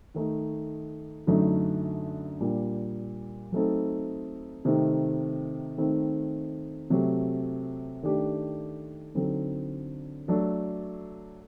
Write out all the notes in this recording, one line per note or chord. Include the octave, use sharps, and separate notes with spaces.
D#3 A3 D#4
F#2 D3 F#3 A3 D#4
A#2 G3 A#3 D4
F#3 A3 C4 D#4 A4
C3 D#3 A3 C4 D#4
D#3 A3 C4 D#4
C3 F#3 A3
D#3 A3 D4 G4
D3 F#3 C4 D#4 A4
F#3 A3 D4 A4